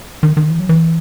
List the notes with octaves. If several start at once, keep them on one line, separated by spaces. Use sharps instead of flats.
D#3
D#3
E3
F#3
E3